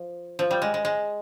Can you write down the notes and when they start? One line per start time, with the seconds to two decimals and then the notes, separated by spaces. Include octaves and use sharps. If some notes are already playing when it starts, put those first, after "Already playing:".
Already playing: F3
0.39 F3
0.51 G3
0.62 G#3
0.74 G#3
0.85 G#3